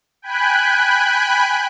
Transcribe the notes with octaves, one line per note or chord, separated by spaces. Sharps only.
G5 G#5 B5 F#6